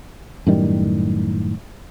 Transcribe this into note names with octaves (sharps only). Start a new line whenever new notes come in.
F#2 A2 D#3 G3